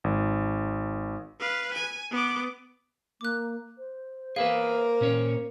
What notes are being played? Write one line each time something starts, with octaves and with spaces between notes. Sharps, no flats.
G#1
B4 F5
G#5
B3 D6
A#3 D6 F#6
C5
A#3 G#4 A#4 B4 E5 F5
A#2 C#4 C#5